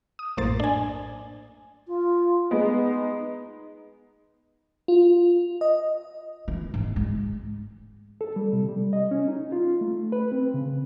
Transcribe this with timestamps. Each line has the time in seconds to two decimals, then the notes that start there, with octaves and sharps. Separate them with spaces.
0.19 D#6
0.37 A#1 F#2 A2 A#3 C5 A6
0.60 D4 G#5
1.88 F4
2.51 G#3 B3 D#4
4.88 F4
5.61 D#5
6.48 E3
6.74 G#2
6.96 G#3
8.21 A4
8.36 G3
8.53 C3
8.69 G3
8.93 D#5
9.11 C#4
9.28 D#4
9.52 F4
9.81 A3
10.12 B4
10.32 C4
10.54 C#3